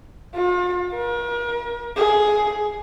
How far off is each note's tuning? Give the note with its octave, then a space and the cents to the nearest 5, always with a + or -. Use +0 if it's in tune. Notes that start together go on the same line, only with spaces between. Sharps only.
F4 +40
A#4 +40
G#4 +10